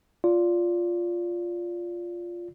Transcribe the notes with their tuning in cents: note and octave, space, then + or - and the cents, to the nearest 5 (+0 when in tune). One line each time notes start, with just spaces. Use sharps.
F4 +0 D5 -20